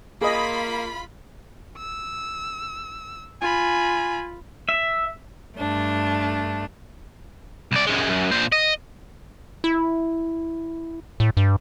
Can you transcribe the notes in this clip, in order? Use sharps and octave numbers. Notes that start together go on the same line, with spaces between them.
A#3 F4 G#4 D#5 B5
E6
F4 G#5 B5
E5
G2 A3 D4
C2 D5
F#2 G#3
F#2
A#2 C5
D#5
E4
A2
G2